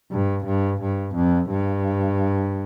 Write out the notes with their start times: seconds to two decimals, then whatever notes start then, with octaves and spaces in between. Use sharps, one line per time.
0.11 G2
0.46 G2
0.81 G2
1.15 F2
1.50 G2